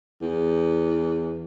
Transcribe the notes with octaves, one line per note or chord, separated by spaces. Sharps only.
E2